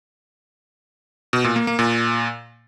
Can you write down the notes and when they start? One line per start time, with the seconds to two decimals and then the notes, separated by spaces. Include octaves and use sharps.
1.33 B2
1.44 A#2
1.56 A#3
1.67 A#3
1.79 A#2